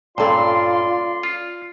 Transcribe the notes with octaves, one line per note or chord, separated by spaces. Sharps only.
G2 A#2 C#4 F4 A4 D5 C6
F4